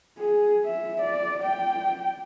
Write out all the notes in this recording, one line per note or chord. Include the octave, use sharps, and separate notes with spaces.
G#4
E5
D5
G5